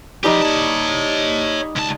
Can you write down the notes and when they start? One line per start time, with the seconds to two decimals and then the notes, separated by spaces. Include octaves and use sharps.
0.24 F3 G3 D#4 G4 D#5
0.42 C#5 A5
1.76 C#2 A5